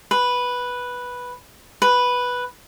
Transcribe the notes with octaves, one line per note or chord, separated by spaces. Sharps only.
B4
B4